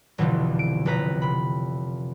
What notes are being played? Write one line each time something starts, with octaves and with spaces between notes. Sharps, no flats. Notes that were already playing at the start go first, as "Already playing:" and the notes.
F1 C2 B2 D3 E3 F3
D7
F1 B1 B4 A#5 B6
C3 B5